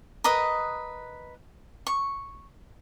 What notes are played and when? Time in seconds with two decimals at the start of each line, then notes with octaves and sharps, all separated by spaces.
0.24 A#4 B4 D#5 D#6
1.87 C#6